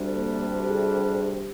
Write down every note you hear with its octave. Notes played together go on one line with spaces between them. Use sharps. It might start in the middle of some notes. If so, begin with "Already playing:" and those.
Already playing: D2 C3 G3 D4
A#3
G4
G#4
G#4
G4